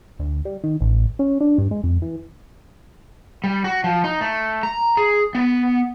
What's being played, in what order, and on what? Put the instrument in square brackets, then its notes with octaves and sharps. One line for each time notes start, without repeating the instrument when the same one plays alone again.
[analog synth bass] D2
G3
D#3
A1
C#4
D4
G2
G#3
F2
E3
[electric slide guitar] G3
F#4
F3
D#4
A3
A#5
G#4
B3